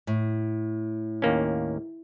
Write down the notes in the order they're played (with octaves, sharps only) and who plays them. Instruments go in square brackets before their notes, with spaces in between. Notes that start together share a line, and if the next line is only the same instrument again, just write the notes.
[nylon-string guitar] A2
[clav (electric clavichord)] D#2 A#3 C#4